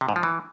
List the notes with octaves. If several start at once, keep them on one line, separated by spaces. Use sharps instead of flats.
C3
G#2
F3
E3